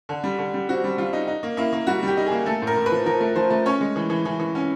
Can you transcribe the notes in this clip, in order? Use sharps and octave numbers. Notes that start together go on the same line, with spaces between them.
D3
G3
D3
G3
C4 F#4
G3
G3 F4
D#4
D#4
A#3
A#3 E4
A#3
G3 F#4
G3 G4
D#4
G#4
A#3
A3 A4
A2
A#4
A2
B4
F3
F3 A#4
A3
F3 C5
A3
C#4 C#5
G#3
E3
E3
E3
E3
C#4